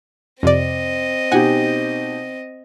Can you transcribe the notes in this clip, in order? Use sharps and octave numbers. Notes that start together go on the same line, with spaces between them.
F2 C3 C4 D5 D#5
B2 D#4 G4 F#5 G#5